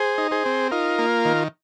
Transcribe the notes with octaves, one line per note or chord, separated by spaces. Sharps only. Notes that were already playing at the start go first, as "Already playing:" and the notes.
Already playing: G#4 C5
D#4
G#4 C5
C4
D#4 F4 A#4
A#3
D#3